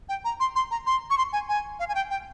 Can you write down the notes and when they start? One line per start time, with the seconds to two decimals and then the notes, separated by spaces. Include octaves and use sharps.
0.09 G5
0.25 A#5
0.40 C6
0.56 C6
0.71 A#5
0.87 C6
1.10 C#6
1.18 C6
1.33 G#5
1.49 G#5
1.80 F5
1.89 G#5
1.95 G5
2.10 G5